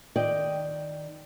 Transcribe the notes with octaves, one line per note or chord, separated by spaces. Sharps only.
D#3 D5 D#5 G5